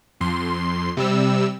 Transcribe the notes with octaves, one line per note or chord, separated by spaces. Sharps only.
F2 C6
C3 G3 E6